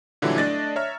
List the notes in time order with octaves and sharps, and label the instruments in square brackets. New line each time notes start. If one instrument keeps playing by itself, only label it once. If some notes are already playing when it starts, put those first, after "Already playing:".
[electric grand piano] A#2 D3 E3 F#3 G3 E4
A3 D4 D5 D#5 A6 A#6
C#5 E5 A#5 F6